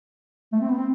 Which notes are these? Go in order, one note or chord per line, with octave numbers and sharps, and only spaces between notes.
A3
C4
B3
C4